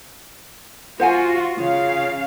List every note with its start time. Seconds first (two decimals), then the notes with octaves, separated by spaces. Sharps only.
1.00 F4 F#4 C5 F#5 G#5
1.58 C#3 F4 F5